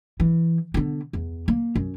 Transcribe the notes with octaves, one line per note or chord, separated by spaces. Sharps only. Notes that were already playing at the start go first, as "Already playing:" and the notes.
E3
D3 B3
E2
A#3
F#2